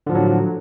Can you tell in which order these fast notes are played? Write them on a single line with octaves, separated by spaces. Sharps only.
D3 F3 A2 F#3